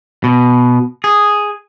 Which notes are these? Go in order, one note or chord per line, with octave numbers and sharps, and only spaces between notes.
B2
G#4